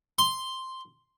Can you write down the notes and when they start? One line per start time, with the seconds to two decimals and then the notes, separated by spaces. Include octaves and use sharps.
0.18 C6